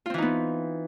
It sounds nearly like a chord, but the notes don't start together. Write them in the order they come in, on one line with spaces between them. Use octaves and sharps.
F4 C4 E3 D#4 B3